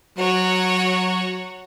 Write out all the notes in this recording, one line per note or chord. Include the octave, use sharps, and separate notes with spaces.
F#3 F#4 C#5